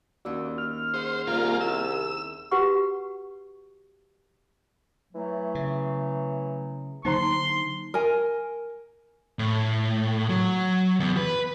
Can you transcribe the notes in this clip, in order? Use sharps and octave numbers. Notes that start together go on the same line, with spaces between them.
D#2 C#4 F#4 D5 E6
F6
G#4 C5 F#5
C2 A#3 F4 A#5
E6
F#4 G4 B4 F#5 C#6
E3 F#3 A3
C#3
D3 F#3 A#3 D#4 C5 A#5 C6
A#4 G#5
A2
F#3
E2
B4